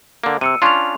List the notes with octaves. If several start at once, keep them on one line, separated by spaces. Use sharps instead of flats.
D3 A#3
C3 E6 C#7 D#7
C#4 D4 F4 C6 C#6 F7